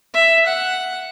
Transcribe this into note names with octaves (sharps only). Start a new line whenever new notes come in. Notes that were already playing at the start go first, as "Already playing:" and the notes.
E5
F#5